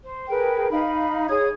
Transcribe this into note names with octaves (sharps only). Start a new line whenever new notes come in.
C5
G#4 A#4 B4 G5
D#4 F5 B5
G#4 C#5 D#6 G#6